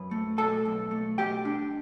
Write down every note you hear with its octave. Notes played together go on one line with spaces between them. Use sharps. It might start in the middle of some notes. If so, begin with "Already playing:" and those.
Already playing: F#2 B4
A3
B2 A4 A5
B1
A3
B2 G4 G5
D4